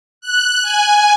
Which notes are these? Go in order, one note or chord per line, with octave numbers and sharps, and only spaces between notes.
F#6
G#5